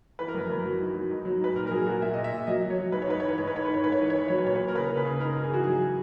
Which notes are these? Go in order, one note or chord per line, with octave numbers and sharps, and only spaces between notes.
E3 B4
A#4
F#2 B4
F#2
F#3
D#3
F#3
G#2
F#3
G#2 B4
A#2 A#4
A#4
F#3 G#4
A#2 F#4
A#2 E5
A#2 D#5
E5
A#2
F#3 D#5
F#3
C#5
F#3
G#2 B4
C#5
G#2 B4
E3 C#5
B4
G#2 C#5
B4
G#2 C#5
D#3 B4
C#5
G#2 B4
C#5
E3 B4
C#5
E3 B4
F#3 C#5
B4
A#2 C#5
B4
A#2
A#4
C#3 B4
C#3
B4
C#3
G#2 A#4
G#2
G#4
E3 F#4
F#3 G#4